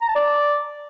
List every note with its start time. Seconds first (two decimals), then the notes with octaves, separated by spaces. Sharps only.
0.01 A#5
0.08 A5
0.15 D5